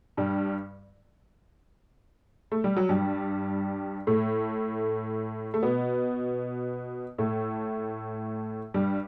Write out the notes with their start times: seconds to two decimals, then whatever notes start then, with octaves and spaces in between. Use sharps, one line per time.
0.17 G2 G3
2.52 A3
2.64 G3
2.77 F#3
2.89 G2 G3
4.07 A2 A3
5.54 A3
5.63 B2 B3
7.18 A2 A3
8.74 G2 G3